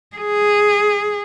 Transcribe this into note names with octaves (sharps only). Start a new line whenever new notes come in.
G#4